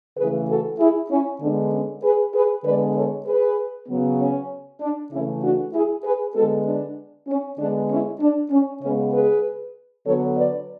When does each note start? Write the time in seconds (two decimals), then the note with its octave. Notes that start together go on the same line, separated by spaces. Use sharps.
0.17 C#3 E3 A3 G#4 B4
0.48 F#4 A4
0.79 E4 G#4
1.10 C#4 E4
1.41 D3 G#3 B3 D4
1.71 C#4
2.03 G#4 B4
2.34 G#4 B4
2.64 D3 G#3 B3 B4 D5
2.96 A4 C#5
3.26 G#4 B4
3.88 C#3 F#3 B3
4.19 C#4
4.81 D4
5.11 C#3 E3 A3 C#4 E4
5.42 D4 F#4
5.74 E4 G#4
6.04 G#4 B4
6.35 D3 G#3 B3 F#4 A4
6.66 D4
7.28 C#4
7.58 D3 G#3 B3 D4
7.89 C#4 E4
8.20 D4
8.51 C#4
8.82 C#3 G#3 B3 C#4
9.13 G#4 B4
10.06 D3 F#3 B3 A4 C#5
10.36 B4 D5